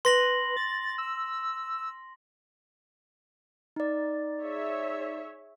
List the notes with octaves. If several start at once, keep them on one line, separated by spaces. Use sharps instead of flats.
B4 C6 A#6 F#7
A6
E6
D#4 D5
G#4 C#5 E5